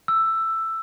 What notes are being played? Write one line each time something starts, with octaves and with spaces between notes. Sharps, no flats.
E6